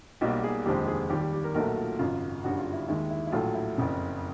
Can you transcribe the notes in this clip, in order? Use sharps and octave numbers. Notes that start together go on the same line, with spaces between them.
B1 B2 G3 A#3 G4
G#4
F1 D#2 D3 F3 G#3 G4
G#4
D#2 D#3 G3 G4
G4
G4
A#4
B1 A#2 F#3 A3 A#4
F4
G#1 F#2 C#3 F4
G1 F#2 D3 G3 F#4
F4
E4
D#2 D#3 G#3 E4
E4
E4
A#1 A2 F#3 A3 F4
E4
F#1 F2 C#3